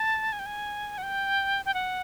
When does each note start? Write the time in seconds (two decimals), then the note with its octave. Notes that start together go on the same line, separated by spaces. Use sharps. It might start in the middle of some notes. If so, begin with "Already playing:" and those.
Already playing: A5
0.32 G#5
0.39 G5
0.46 G#5
0.98 F#5
1.03 G5
1.65 G5
1.74 F#5